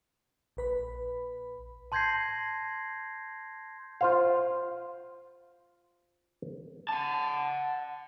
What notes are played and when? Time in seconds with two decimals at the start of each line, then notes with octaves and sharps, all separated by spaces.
0.57 A#1 B4 B5
1.92 A5 C6 G6 G#6 A#6 C7
4.01 F4 C5 F5
6.89 F#5 A5